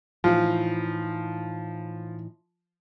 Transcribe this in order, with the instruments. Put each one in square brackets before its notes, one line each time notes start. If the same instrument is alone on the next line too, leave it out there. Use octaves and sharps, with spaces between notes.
[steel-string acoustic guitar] A2 E3 D#4 [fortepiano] F3